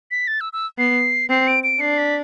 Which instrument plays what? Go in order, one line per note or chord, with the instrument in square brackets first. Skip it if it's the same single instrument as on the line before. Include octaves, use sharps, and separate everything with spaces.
[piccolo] B6
A6
E6
E6
[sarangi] B3 [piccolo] C7
[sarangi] C4 [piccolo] C7
[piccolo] D7
D7
[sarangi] D4 [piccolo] C7
[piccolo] B6